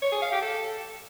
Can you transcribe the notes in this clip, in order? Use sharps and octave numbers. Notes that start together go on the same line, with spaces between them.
C#5
G#4
F5
G4
A4